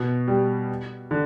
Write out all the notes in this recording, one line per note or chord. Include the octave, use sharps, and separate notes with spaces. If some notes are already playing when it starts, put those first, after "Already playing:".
Already playing: B2
G3
D3